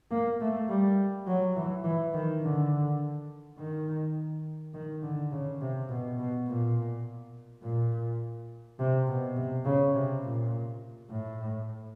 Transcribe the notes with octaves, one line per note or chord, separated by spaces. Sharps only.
A#3
A3
G3
F#3
E3
E3
D#3
D3
D#3
D#3
D3
C#3
C3
B2
B2
A#2
A#2
C3
B2
C3
C#3
C3
A#2
A2